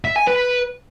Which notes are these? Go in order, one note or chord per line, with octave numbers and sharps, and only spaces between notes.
E5
G#5
B4